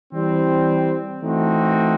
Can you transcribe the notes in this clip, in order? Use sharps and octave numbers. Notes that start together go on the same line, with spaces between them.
E3 G3 C4
E3 A3 C4 D#4 F#4